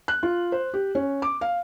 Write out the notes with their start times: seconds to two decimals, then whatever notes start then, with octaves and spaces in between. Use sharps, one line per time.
0.08 F#6
0.23 F4
0.52 C5
0.74 G4
0.95 C#4
1.22 D6
1.41 F5